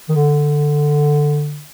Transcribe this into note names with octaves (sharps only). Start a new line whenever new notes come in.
D#3
D3